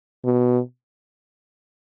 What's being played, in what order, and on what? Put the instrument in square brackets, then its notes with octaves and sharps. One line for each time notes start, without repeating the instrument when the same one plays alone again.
[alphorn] B2